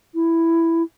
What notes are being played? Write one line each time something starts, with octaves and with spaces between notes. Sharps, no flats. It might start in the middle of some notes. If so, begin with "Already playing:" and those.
E4